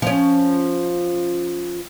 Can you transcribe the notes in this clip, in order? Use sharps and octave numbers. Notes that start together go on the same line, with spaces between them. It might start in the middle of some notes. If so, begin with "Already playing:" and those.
F3 C#4